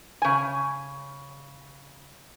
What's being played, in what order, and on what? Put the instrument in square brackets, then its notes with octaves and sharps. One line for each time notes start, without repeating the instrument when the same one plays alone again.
[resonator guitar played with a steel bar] C#3 G#5